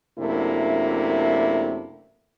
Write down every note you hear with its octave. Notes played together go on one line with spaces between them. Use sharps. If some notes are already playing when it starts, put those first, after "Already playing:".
F#2 C3 A3 A#3 D4 E4